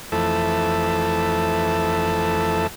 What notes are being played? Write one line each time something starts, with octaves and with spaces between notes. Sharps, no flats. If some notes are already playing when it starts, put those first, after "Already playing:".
F2 E3 A3 A4